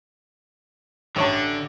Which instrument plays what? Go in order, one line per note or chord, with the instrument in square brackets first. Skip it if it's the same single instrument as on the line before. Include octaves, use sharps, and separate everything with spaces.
[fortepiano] A1 C#5 A5 [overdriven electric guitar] D3